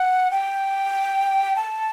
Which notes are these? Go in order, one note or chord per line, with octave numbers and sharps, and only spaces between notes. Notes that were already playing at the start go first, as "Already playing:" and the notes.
Already playing: F#5
G5
A5